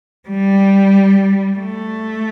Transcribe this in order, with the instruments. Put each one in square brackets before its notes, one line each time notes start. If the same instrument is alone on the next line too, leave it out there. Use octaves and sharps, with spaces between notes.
[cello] G3
A3